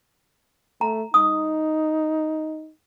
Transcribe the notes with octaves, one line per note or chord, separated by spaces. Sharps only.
A3 A#5
D#4 D#6